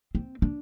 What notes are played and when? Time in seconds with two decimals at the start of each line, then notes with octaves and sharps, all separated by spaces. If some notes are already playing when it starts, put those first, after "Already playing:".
0.15 C4
0.42 D4